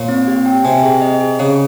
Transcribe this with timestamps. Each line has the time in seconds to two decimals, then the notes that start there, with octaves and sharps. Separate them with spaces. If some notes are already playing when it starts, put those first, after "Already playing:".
Already playing: A#2 C#5
0.09 C4
0.28 G4
0.46 G5
0.64 C3 G#5
0.83 G#4
1.02 D#5
1.21 G#4
1.39 C#3 C#5